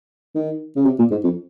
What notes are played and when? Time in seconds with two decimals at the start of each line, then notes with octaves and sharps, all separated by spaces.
0.35 D#3
0.76 C#3
0.85 C3
0.99 A#2
1.11 G#2
1.24 F2